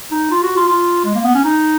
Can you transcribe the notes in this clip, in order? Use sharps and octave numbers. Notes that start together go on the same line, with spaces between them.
D#4
F4
F#4
F4
F4
G#3
A#3
B3
C#4
D#4